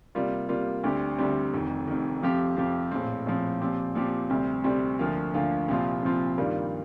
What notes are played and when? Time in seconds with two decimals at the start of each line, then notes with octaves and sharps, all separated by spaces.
0.15 C3 G3 A#3 F4
0.49 C3 G3 A#3 F4
0.84 D2 D3 G3 C4 G4
1.18 D2 D3 G3 C4 G4
1.53 F1 F2 D#3
1.87 F1 F2 D#3
2.22 F2 C3 F3 C4 G4
2.57 F2 C3 F3 C4 G4
2.92 A#1 A2 F3 C4
3.26 A#1 A2 F3 C4
3.60 A#2 F3 C4 G4
3.95 A#2 F3 C4 G4
4.30 D2 C3 G3 C4
4.64 D2 C3 G3 C4
4.99 D2 D3 F3 A#3 F4
5.34 D2 D3 F3 A#3 F4
5.68 C2 A#2 F3 C4 F4
6.03 C2 A#2 F3 C4 F4
6.38 G2 D#3 G3 A#3 F4